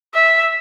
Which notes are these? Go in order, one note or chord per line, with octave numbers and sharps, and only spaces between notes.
E5